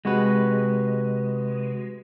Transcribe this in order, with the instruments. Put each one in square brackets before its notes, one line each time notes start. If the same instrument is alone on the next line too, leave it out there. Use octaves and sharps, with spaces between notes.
[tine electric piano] C3 F#4 B4 [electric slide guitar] G#3